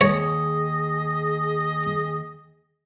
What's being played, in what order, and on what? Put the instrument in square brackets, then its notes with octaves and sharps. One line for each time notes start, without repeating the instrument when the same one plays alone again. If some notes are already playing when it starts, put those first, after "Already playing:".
[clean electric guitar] D#2 [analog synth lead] G#4 [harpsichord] C#5 [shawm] D#5